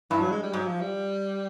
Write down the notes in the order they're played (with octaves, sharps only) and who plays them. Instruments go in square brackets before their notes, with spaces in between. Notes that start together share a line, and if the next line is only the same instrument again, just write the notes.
[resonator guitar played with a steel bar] G2 [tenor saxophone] E3
[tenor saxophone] F#3
G#3
G3
[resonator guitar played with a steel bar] G#2 [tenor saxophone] F#3
[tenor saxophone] F3
G3